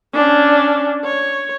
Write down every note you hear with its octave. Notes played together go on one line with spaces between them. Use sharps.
C#4 D4
C#5